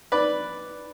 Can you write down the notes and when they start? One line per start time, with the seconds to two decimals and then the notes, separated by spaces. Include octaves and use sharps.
0.12 B4 D5